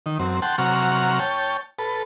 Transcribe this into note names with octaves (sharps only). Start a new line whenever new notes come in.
D#3
F#2 C4
F#5 G5 A5 C6
C3 F#3 F#5 A#5 C#6 F6
C#5 G5 A5
A4 B4